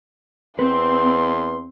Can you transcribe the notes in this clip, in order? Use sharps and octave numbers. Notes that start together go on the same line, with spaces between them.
E2 C4 B4 C6